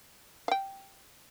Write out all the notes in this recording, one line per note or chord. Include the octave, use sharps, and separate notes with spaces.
F5 G5